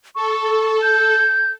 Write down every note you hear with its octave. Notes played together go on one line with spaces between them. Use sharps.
A4 C#6
G6